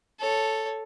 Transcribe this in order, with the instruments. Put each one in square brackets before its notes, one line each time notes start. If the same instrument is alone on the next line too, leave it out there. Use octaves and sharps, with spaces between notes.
[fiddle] A4 C#5